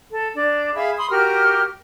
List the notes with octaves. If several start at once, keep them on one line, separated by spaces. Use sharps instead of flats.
A4
D4 D5
G#4 E5 F5 B5
B5 C6 D#6
F#4 G4 A#4 F6